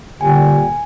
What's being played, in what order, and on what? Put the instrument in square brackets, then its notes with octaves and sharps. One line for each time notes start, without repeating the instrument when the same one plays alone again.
[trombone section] A#2 G3 G4 [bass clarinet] D3 [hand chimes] G#5